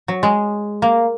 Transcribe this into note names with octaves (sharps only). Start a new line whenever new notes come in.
F#3
G#3
A#3